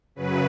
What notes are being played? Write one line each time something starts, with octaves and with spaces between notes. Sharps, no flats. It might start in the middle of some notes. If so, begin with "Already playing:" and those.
F#2 C#3 F#3 B4